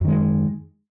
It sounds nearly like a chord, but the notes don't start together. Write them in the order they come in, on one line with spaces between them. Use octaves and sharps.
F#2 D#3 G#3